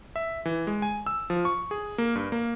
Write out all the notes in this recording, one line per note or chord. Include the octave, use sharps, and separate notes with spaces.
E5
E3
G#3
G#5
E6
F3
C#6
G#4
A#3
G2
A#3